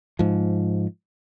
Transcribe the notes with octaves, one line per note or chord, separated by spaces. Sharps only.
G#2 F3